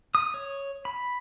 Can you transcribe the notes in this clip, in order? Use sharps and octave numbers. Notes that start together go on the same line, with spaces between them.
D#6
C#5
B5